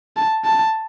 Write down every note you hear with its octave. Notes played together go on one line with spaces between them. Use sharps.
A5
A5